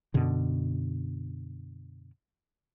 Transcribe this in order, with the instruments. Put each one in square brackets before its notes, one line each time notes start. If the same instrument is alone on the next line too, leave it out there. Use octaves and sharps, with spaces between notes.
[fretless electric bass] F#2 B2 D3